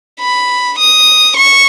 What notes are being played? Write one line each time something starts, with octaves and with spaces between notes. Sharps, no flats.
B5
D#6
C#6